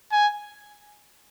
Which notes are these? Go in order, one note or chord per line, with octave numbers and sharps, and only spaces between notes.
G#5